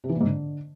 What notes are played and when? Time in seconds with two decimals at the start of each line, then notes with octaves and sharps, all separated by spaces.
0.04 C3
0.09 E3
0.15 A#2
0.21 G#2
0.26 D3